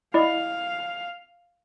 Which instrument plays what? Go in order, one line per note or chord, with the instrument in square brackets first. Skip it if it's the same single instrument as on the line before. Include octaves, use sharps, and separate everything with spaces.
[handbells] E4 D5 D#5 [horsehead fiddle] F5